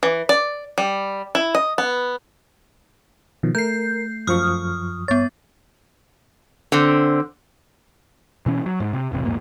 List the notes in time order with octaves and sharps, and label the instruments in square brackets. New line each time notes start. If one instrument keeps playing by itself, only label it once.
[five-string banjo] E3
D5
G3
E4
D#5
B3
[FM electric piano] B2 D#3 F3
[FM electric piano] A3 [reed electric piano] A#4 [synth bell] G6 C7
[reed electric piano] F#2 F3 C#6 [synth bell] D#6 F6
[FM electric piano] G2 C#5 [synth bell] B3 A6
[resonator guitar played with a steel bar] D3 C4
[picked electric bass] B2 E3 C#4
F#3
G#2
C3
E1 A1 C3
A#1 E2 G#2 A#3